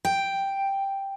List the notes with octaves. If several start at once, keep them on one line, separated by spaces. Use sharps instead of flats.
G5